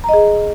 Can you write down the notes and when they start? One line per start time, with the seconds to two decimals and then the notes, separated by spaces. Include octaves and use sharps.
0.04 A#5
0.09 D#5
0.13 G#4